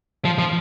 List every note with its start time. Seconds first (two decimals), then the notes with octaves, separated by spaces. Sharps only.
0.25 F3
0.39 F3